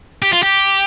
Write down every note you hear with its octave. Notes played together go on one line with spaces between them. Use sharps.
G4
F4
G4